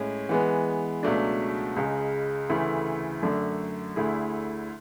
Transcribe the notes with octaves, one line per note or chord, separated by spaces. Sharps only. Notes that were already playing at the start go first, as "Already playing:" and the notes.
Already playing: A2 G#3 C#4
E3 G#3 B3
C#2 B2 F#3 A3 D4
C#2 C#3 G#3
D2 C#3 E3 A3 E4
F#2 D3 A3 D4
D2 D3 A3 E4 G#4